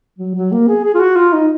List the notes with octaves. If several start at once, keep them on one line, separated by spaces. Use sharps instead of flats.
F#3
F#3
A#3
G#4
G#4
F4
F#4
F4
D#4